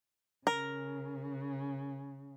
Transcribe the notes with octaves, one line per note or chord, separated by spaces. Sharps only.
C#3 A#4